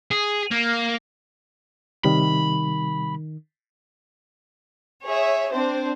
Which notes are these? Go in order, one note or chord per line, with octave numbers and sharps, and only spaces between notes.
G#4
A#3
C3 D#3 G3 B5
G#4 C#5 E5
C4 D4 C5